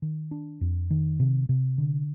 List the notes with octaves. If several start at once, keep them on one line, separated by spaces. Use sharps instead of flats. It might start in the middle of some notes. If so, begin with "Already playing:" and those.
D#3
D4
F2
D#3
C3
C3
D3